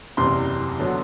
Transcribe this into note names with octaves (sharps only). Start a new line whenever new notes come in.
F#1 E2 C3 C6
D3 F#3 B3